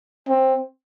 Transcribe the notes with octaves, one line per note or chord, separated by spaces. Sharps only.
C4